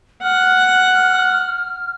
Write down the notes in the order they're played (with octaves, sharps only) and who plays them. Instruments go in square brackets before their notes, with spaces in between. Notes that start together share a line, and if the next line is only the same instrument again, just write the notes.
[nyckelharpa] F#5 [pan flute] F6